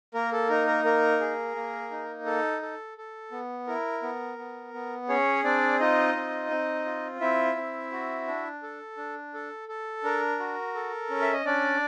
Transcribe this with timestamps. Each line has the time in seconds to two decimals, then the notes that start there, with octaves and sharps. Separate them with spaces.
0.14 A#3 A#4
0.32 A4
0.49 D#4 A#4
0.67 A#4
0.84 A#3 A#4
1.20 G#4
1.55 A#3
1.91 D#4
2.26 A4
2.62 A4
2.98 A4
3.32 B3
3.67 E4 A#4
4.02 B3
4.38 B3
4.74 B3
5.09 C#4 G#4 C#5
5.44 C4 D4 D5
5.80 D#4 F4 D#5
6.16 C4
6.51 C4
6.86 F4
7.21 C4 E4 E5
7.56 C4
7.92 F#4
8.27 D4
8.63 A4
8.97 D4
9.34 A4
9.68 A4
10.04 D4 A#4
10.40 F#4
10.75 A4
11.10 C#4
11.22 E5
11.33 D#5
11.45 C#4 D4 D5